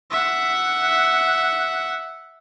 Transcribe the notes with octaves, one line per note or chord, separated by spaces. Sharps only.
E5 F#5